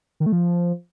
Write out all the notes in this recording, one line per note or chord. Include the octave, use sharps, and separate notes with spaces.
D#3
A3
F3